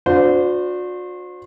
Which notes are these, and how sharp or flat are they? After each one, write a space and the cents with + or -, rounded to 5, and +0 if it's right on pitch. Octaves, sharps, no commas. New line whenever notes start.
D4 +0 F#4 -45 C5 -25